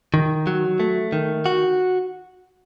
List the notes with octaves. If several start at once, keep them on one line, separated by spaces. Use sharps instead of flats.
D#3
F#3
A3
D#3
F#4